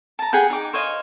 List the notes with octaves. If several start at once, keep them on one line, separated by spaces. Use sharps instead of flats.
A5 A#5
G#4 F#5 G5 B5
D#4 D6
C5 C#5 D#5 F5